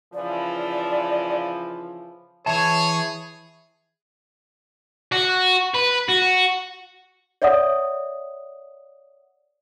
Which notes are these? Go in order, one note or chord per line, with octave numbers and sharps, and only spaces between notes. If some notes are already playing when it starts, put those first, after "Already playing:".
C#3 E3 F3 D5
E3 G#4 C#5 E5 A5 F7
F#4
B4
F#4
C#5 D5 E5 F#5 D#6